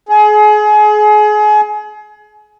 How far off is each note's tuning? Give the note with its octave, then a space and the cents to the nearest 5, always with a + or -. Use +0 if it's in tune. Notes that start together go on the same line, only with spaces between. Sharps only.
G#4 +30